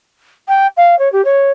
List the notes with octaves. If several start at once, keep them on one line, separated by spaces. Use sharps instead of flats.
G5
F5
C#5
G4
C#5